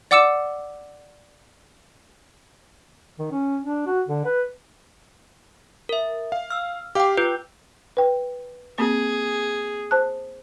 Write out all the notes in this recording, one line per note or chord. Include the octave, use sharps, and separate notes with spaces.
D5 F#5 D6 E6 C#7 E7
D#3
C#4
D4
F#4
D3
B4
A#4 E5
F5
E6 F6
G4 F5 G5 D6
F4 B4 G6
B4 G5
A#3 C4 G#4
C5 A5 F#6